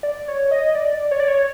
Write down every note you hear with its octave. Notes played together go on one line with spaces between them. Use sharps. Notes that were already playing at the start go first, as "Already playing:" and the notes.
D5
C#5
D#5
D5
C#5
D5
C#5